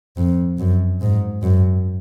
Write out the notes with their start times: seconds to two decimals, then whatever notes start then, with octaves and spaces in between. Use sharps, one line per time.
0.17 F2
0.59 F#2
1.02 G#2
1.43 F#2